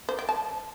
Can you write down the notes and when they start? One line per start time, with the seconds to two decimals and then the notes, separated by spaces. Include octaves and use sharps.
0.09 C5
0.19 G5
0.29 A5